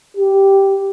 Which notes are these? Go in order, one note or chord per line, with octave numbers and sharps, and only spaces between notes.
G4